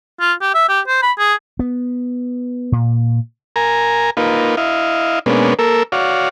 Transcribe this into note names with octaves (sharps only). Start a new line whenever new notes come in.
F4
G4
E5
G4
C5
B5
G#4
B3
A#2
A#4 G#5 A#5
A#3 D#4 F4 B4
E4 D#5 F5
B2 G#3 A#3 B3 C#4 D4
A#3 A4 A#4 E6
F#4 C#5 D5 F5